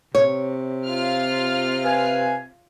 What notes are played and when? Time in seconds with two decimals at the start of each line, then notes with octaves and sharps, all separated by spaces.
0.15 C3 C#5
0.86 F4 F6
1.84 B4 F5 G#5